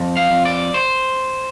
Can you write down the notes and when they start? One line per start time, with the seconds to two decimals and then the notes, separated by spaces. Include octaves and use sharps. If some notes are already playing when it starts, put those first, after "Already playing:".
Already playing: F2
0.17 F5
0.31 F2
0.45 D5
0.74 C5